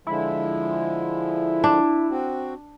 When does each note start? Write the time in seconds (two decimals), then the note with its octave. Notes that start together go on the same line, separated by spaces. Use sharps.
0.07 D3 F3 G#3 E4
1.64 D4
2.10 C4 F#4